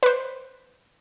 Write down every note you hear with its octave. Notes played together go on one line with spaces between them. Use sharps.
B4 C5